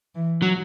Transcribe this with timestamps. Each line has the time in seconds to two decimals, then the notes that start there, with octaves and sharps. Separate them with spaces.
0.15 E3
0.42 F#3